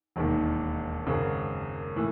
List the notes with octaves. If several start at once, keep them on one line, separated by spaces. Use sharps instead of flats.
E1 D#2 D#3
G#1 F#2 C#3
A2 E3